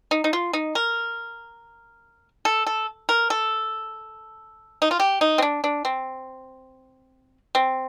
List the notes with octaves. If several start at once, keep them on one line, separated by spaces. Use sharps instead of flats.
D#4
D#4
F4
D#4
A#4
A4
A4
A#4
A4
D#4
F4
G4
D#4
C4
D4
D4
C4
C4